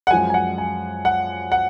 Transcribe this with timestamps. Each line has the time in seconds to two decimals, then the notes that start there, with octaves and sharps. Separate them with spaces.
0.07 F#5
0.11 F#2 F3 G#3 G#5
0.30 G#5
0.34 F#5
0.58 G#5
1.05 F#5
1.52 F#5